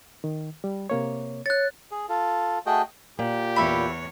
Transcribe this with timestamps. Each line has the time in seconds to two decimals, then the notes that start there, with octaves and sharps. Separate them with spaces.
0.24 D#3
0.64 G3
0.90 C3 A#3 C#5
1.46 C#5 F#6 A6
1.91 G#4
2.09 F4 A4
2.66 A3 F#4 G#4 D#5 G5
3.19 A#2 G4
3.56 E2 C#5 E5 B5